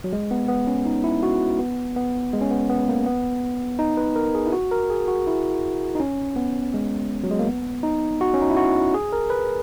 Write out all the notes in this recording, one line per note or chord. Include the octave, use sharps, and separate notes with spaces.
F#3
G#3
B3
B3
C#4
D#4
E4
F#4
B3
B3
G#3
C#4
B3
B3
A#3
B3
D#4
B4
A#4
G#4
E4
F#4
A#4
G#4
F#4
E4
D#4
C#4
B3
G#3
F#3
G#3
A#3
B3
D#4
F#4
C#4
D#4
E4
F#4
G#4
A#4
B4